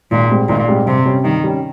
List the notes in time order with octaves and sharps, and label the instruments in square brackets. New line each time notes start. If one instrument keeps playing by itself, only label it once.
[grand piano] G#1 [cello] A#2
[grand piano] G#2 G3 C4
[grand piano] G#1 [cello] A#2
[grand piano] G#2 G3 C4
[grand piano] G2 [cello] C3
[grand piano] G3 C#4
[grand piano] G2 [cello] D#3
[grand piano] G3 C#4